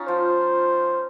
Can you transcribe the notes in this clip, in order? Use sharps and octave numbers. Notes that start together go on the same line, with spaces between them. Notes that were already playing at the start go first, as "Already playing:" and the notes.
Already playing: C#4 D#4 F4
F3 C5